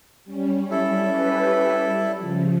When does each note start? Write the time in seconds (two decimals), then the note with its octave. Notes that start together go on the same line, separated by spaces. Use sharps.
0.24 G3 C#4
0.71 E4 A4
1.04 C#4 G4 B4
1.71 G3
2.17 C#3 F3